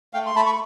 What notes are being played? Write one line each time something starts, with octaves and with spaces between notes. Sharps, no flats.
A3 F5 G5
C6
A3 A5 B5
B5 C#6